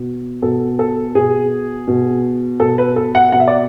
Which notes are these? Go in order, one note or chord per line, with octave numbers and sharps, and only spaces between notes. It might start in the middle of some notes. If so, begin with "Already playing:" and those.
Already playing: B2
B2 A4
A4
B2 G#4
B2
B2 A4
B4
A4
F#5
B2 F#5
E5
D5